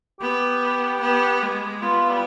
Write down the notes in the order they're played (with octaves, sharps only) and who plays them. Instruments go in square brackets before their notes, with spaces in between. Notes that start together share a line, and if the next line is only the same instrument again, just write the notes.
[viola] B3 [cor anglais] G4
[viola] B3
G#3
[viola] B3 [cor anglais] F4
[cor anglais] G3